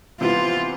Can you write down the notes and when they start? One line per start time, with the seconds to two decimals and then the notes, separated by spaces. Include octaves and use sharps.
0.20 C3 E3 B3 F4